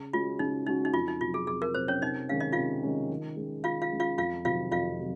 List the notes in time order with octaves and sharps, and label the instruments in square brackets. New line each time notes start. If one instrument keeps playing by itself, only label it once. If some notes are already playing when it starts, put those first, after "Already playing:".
Already playing: [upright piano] C#3
[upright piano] G#3 C#4 F#4 [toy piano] F4
[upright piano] C#3 [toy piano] D#4
[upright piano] G#3 C#4 F#4 [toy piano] D#4
[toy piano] D#4
[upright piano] F2 [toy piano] F4
[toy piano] D#4
[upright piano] C3 F#3 [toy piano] F4
[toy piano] G#4
[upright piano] F2 [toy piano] G#4
[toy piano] A#4
[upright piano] C3 F#3 [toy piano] C5
[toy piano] C#4 C#5
[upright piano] C3 [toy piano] D#4 D#5
[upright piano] D#3 G#3 C#4 [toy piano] F5
[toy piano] D#5
[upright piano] C3 [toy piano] F4 F5
[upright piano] D#3 G#3 C#4
D#3
G#3 C#4
[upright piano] D#3 [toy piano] F4 F5
[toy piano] F4 F5
[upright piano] G#3 C#4
[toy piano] F4 F5
[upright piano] F2 [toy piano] F4 F5
[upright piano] C3 D#3 F#3 C4 [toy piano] F4 F5
[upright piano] F2 [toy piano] F4 F5
[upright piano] C3 D#3 F#3